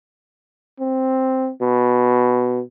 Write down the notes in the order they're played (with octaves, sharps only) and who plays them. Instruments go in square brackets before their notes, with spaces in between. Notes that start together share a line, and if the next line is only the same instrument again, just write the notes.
[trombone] C4
B2